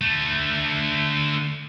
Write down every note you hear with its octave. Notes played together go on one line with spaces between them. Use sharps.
D3 A3